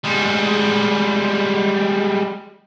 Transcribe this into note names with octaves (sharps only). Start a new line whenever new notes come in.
G3 G#3